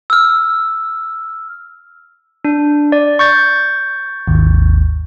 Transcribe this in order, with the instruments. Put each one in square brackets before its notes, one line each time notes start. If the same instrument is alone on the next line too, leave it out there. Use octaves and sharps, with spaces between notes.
[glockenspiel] E6 F6
[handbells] D4
D5
C#6 G6 A6
[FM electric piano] G#1 D#2